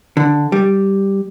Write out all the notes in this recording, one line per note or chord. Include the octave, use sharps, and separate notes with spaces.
D3
G3